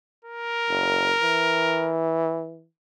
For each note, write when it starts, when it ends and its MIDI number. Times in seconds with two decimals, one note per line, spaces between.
0.25 1.97 70
0.69 1.12 30
1.22 2.66 52